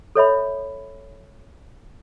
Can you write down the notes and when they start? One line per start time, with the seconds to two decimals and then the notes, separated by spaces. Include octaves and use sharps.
0.15 A4 C#5 E5 B5